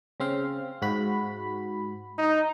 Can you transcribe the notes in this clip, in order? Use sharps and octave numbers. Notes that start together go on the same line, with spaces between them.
C#3 C4 F5
G#2 F#4 B5
D#4